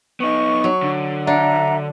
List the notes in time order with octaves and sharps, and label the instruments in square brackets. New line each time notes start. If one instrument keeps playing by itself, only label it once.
[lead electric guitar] B3 D#4 [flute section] C#6
[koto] F#3
[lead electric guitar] D3
[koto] D4 [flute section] E5 F#5 A#5